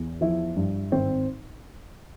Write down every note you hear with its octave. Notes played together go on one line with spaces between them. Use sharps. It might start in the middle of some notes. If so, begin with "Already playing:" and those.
Already playing: E2
F3 E4
G2
G#1 C4